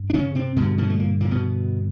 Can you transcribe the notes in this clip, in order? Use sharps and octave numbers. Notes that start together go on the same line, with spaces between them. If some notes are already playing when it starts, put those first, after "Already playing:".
Already playing: G2
D4
C#3 C#4
C3 C4
G2 B2 D3 B3
B2 B3
A3
A#2 A#3
A#2 A#3
B2 B3